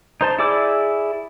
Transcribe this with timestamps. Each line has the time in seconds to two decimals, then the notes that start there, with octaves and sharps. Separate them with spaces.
0.21 D#4 C5 A5
0.39 E4 G#4 D5 D6 E6